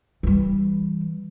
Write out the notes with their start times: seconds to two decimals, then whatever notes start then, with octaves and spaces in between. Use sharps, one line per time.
0.23 E3 G3